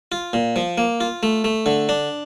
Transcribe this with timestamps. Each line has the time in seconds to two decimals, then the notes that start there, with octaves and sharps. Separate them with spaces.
0.12 F4
0.33 A#2
0.56 F3
0.78 A#3
1.01 F4
1.23 A3
1.44 A3
1.66 D3
1.89 D4